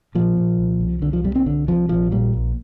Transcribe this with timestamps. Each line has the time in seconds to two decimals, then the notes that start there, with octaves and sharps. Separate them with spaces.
0.15 A#2 F3
0.37 A#2
0.58 C2
0.80 C2
1.02 C2 D3
1.13 F3
1.24 C3 G3
1.35 C4
1.46 C2 D3
1.68 C3 F3
1.89 A#1 F3
2.12 A#2 G3
2.33 A#1